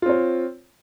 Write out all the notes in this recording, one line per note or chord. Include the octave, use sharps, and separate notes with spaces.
C4 F4 C#5